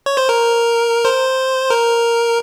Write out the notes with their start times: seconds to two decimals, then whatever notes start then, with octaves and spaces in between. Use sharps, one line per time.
0.06 C#5
0.17 C5
0.29 A#4
1.05 C5
1.70 A#4